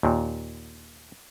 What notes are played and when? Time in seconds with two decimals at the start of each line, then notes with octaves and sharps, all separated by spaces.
0.03 D#2 A#2